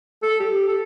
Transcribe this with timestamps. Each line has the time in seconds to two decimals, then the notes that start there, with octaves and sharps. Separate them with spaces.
0.23 A4
0.40 G4
0.68 A4